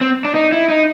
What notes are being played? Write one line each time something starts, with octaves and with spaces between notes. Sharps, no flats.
C4
D4
D#4
E4
D#4